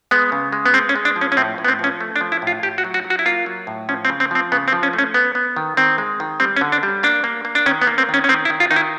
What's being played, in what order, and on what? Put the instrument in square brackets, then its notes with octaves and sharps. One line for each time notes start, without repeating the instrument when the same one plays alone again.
[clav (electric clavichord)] G#3 B3
C#3
G#3
B3
G#3 C4
C#4
G#3
D4
F3
C#4
C#4
A2 C4
A2
B3
C4
F3 C#4
A3
D4
F3
E4
A2
F4
A2 G4
F#4
F#3
F#4
F#3
F#4
E4
A#3 F4
F#3
A2
F3 C#4
C4
C#3
C4
F3 C4
C#3 B3
C4
F3
C#4
A3
C#4
B3
B3
D#3
D#3 C4
G#3
D#3
G3 C4
C#4
D3
D4
G3
A#3 D4
A#3
A#3
D4
D#3 C#4
B3
A#3
C4
D#3
C#4
C#4
D#3 C4
E4
D#3
F4
D#3 D#4
E4